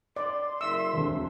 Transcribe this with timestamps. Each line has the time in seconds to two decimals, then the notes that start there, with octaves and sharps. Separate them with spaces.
0.16 D5 C6
0.61 F#1 E5 E6
0.94 E1 D2